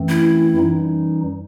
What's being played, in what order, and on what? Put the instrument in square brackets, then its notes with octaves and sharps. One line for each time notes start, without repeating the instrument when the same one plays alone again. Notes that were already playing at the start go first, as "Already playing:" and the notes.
Already playing: [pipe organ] F#2 E3 A3 C4
[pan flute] E4
[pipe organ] F#2 E3 G3 D#4